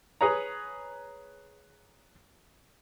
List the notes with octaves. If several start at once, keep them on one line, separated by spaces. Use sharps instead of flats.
G#4 B4 C#5 A#5